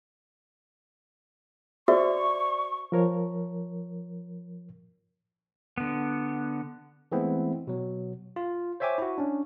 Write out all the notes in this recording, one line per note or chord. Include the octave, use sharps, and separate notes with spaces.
F#4 C5 D5 E5 C#6
F3 A#4 C#5
D3 B3
E3 G#3 A3 B3 C4 E4
B2 F#3
F4
C5 C#5 E5 G5 G#5 D6
E4 F#4
C#4 D4